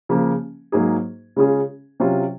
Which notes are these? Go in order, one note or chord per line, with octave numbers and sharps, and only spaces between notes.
C#3 F3 A#3
G#2 F#3 A#3 D#4 G#4
C#3 G#3 C#4 F4 G#4
C3 F#3 C#4 F4